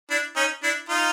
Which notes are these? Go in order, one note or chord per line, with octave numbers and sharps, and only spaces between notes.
D4 E4
C#4 D#4
D4 E4
D#4 F4